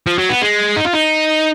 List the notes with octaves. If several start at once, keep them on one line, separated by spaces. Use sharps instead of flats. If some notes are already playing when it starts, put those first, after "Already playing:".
F3
F#3
B3
G#3
D#4
F4
D#4